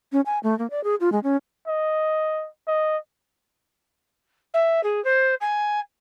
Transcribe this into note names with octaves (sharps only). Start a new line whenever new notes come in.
C#4
G#5
A3
A#3
D5
G#4
F4
G#3
C#4
D#5
D#5
E5
G#4
C5
G#5